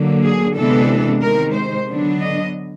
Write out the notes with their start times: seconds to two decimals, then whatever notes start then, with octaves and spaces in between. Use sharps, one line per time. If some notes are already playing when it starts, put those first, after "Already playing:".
Already playing: D3 F#3 A#3
0.23 G#4
0.56 C3 E3 G#3 B3 D4 A4
1.22 C3 D#3 G#3 A#4
1.55 C5
1.88 D3 F#3 B3 D4
2.21 D#5